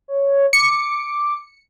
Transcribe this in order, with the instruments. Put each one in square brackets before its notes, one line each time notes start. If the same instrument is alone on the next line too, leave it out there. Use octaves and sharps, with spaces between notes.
[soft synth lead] C#5
[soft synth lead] D6 [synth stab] C#7